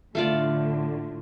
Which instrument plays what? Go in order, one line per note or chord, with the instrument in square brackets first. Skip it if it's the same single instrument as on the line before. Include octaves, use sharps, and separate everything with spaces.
[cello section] A2 D3 [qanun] A3 F4 D5